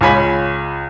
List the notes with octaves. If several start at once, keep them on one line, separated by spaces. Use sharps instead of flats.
C#2 F4 C#5 G#5 B5 B6